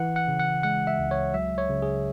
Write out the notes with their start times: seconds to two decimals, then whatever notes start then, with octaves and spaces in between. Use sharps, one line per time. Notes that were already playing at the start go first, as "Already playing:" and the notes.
Already playing: E3 F#5
0.16 F#5
0.28 C#3
0.40 F#5
0.63 G#3 F#5
0.87 E5
0.99 C#2
1.11 C#5
1.34 F#3 E5
1.58 C#5
1.69 C#3
1.82 G#4